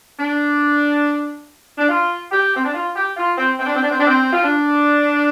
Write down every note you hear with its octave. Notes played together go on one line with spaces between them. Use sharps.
D4
D4
F4
G4
C4
D4
F4
G4
F4
C4
C4
D4
C4
D4
C4
D4
C4
F4
D4